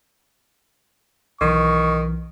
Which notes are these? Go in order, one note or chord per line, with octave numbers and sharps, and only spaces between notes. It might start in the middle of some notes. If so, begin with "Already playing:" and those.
B1 D#3 E3 C#6